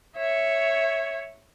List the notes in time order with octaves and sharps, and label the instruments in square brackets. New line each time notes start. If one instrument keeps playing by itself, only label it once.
[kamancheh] C#5 E5